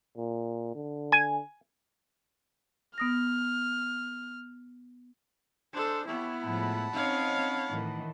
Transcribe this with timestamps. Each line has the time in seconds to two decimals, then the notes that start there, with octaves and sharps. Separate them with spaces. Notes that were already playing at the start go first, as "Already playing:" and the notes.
0.17 A#2
0.75 D3
1.12 G#5
2.98 B3 D#6 F6 A#6
5.73 G#3 D4 A4 C5
6.06 B3 E4 G4 A4 C#5
6.44 A2 F3 G#3 F#5 A5 B5
6.93 C4 C#4 D#4 C#5 F5
7.70 A2 D#3 E3